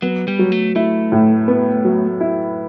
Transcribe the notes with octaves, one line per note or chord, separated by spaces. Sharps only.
F#3 B3
G3
F#3
A3
A3 E4
A2
B3
F#3
E4